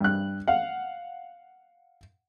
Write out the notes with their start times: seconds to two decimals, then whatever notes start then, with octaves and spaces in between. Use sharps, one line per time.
0.01 G2 F#6
0.48 F5 F#5